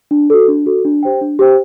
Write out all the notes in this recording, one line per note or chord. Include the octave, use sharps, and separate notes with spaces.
D4
F#4 A4
D4
F#4 A4
D4
G4 C5 G5
D4
G4 C5 G5